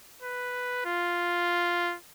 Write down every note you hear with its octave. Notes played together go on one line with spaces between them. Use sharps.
B4
F4